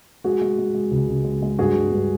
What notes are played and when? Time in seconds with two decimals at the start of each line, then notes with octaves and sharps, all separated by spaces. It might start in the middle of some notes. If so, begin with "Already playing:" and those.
0.24 G#3 F#4 G#4
0.41 G#3
0.59 G#3
0.74 G#3
0.91 C#2
1.08 C#2
1.25 G#3
1.42 G#3
1.59 G2 F#4 G#4
1.76 G3
1.92 G2